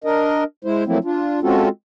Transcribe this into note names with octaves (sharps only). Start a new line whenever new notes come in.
D4 A#4 D#5
G#3 E4 C5
F3 F#3 A3 A#3 C4 E4
D4 F4
G#3 C4 C#4 F4 F#4 A4